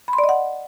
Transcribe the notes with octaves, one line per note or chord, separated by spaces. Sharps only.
B5
C6
D5
D#5
F#5